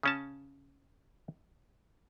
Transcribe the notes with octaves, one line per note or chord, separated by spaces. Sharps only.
C#3 C#4 A5